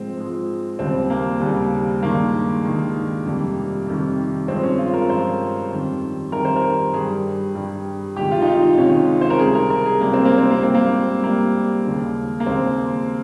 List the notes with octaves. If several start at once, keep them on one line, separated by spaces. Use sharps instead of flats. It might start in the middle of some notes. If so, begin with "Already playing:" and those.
Already playing: G#2 F3 G#3 C4
G#2 F3 G#3
D#2 C#3 G3 C4
A#3
D#2 C#3 G3
G2 D#3 G#3 A#3
G2 D#3 G#3
F2 C3 D#3 G3
F2 C3 D#3 G3
G2 F3 G#3 C4
C#4
F4
A#4
G2 F3 G#3 C5
F2 D#3 G3
F2 D#3 G3 A#4
C5
A#4
G2 G3 G#4
G2 G3
C2 C3 D#3 G#3 G4
F4
D#4
F4
D#4
C2 C3 D#3 G#3 C#4
C5
A#4
C#2 C3 G3 G#4
A#4
A#4
G#4
C#2 C3 G3 A#3
C4
A#3
C4
A#3
G#2 G3 C4
A#3
G#2 G3 A#3
D#2 C#3 G#3
A#3
D#2 C#3 G#3 C4